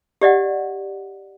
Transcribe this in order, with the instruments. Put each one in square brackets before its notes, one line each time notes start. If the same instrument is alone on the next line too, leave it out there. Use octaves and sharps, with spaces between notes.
[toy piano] G4 D5 D#5 F#5